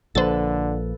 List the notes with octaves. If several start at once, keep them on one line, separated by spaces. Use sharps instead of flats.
A#1 D3 F3 A#3 A4 B4 C5 A6